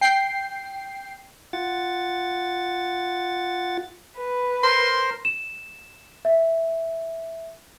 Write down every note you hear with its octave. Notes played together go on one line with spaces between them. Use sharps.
G5 C7
F4 F#5 A6
B4
A#4 C5 C6
E7
E5